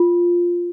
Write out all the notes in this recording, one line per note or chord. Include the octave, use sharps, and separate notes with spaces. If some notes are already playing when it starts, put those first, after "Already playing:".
Already playing: F4